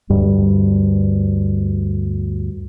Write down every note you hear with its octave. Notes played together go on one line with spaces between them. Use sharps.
D2 G2 G3